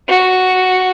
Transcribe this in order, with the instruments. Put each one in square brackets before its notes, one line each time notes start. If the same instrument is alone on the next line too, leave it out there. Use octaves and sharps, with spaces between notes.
[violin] F#4